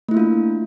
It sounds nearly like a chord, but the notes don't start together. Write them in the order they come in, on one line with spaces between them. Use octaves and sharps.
A3 E4 A#3 F4 D4